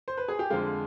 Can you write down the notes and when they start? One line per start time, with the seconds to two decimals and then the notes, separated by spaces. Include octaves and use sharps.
0.08 C5
0.17 B4
0.28 G#4
0.39 G4
0.50 F2 D3 F3 G#3 F4